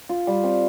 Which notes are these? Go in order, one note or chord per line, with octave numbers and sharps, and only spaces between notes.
F4
G3
C4